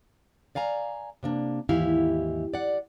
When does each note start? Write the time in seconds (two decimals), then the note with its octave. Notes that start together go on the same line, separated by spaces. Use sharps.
0.55 D5 F5 G#5 A#5
1.23 C3 A#3 D4
1.69 D#2 G#2 E3 E4 G4 F5
2.54 D5 F#5